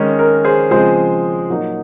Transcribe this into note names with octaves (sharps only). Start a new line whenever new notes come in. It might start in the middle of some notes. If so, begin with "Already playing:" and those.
Already playing: D#3 G#3 C#4
A#4
G#4 C5
C#3 F3 G#3 C4 G#4 C5
A#2 F#3 A#3 D#4